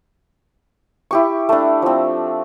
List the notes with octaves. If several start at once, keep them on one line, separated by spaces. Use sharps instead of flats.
E4 G4 C#6
A3 D4
F3 C4